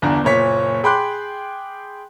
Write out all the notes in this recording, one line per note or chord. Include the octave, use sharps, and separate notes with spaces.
G1 E2 D3 D4 A#5
F#1 A#2 C#5 B6
G#4 G5 B5 C6 D6 F#6